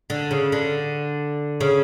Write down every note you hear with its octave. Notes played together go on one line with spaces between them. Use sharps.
D3
C#3
D3
C#3